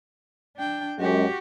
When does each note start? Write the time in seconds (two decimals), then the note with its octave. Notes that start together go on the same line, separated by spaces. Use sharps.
0.56 D4 G5
0.99 F#2 G#3 F#4 G4